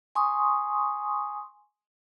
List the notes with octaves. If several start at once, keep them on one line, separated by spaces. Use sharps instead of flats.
G#5 C6 C#6 D#6